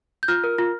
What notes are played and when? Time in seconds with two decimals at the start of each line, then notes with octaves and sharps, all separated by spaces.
0.23 G6
0.28 F4 F6
0.44 A#4
0.58 F4